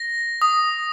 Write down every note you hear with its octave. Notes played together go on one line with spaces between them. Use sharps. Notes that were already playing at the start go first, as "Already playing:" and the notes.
Already playing: A#6
D#6